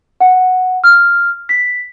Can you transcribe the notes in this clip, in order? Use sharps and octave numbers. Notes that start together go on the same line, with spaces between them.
F#5
F6
B6